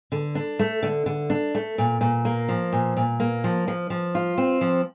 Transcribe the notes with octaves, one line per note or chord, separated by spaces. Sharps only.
D3
D4
A3
D3
D3
D4
A3
A#2
A#2
A#3
F3
A#2
A#2
A#3
F3
F3
F3
F4
C4
F3